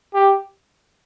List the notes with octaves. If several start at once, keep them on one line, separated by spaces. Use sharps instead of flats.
G4